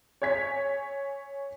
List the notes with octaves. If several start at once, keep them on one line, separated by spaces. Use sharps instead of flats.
C#5 G#5 G#6 B6